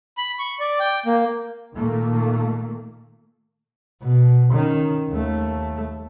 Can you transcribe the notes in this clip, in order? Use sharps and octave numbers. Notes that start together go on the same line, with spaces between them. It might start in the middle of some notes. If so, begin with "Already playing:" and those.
B5
C#6
D5
G5
A#3
A#2 D#3 A3 A#3
B2
D#3 C#4
D#2 A3